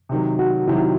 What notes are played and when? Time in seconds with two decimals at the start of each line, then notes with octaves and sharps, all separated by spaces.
0.09 C3 D#3 F#3
0.39 F#4
0.67 C3 D#3 F#3 E4